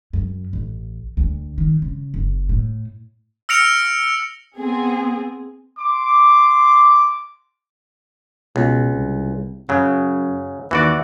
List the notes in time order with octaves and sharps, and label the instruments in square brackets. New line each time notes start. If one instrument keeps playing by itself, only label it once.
[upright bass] F#2
A1
D2
D#3
C#3
F#1
A2
[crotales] E6 F6 A#6 C#7 D7 F7
[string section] B3 C4 G#4
[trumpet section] C6 D6
[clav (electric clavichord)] C#2 [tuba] B2
[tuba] C2
[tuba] F#2 [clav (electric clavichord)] C#3 F#3
[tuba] D#2 [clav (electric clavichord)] E3 F#4 D5